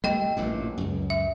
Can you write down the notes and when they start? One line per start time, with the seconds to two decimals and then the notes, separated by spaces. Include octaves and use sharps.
0.04 G3 A3 D#5 G5
0.36 A1 G2 A#2
0.78 C#2 F#2
1.10 E5